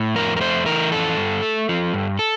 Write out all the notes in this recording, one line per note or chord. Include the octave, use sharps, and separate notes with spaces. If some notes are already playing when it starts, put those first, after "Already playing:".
Already playing: A2
F2 A#4
A#4
A3 C5
E3 A#4
F2 A4
G2
A3
F3
G2
A4